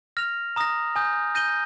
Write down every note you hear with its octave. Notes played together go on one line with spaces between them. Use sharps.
F6 A#6 F7
A#5 D#6 A#6
G#5 D#6 G6
G6 A#6 D#7 G7